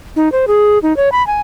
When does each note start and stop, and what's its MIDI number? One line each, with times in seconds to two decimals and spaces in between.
0.16 0.31 63
0.32 0.45 72
0.48 0.79 68
0.83 0.96 63
0.97 1.09 73
1.12 1.25 83
1.27 1.41 80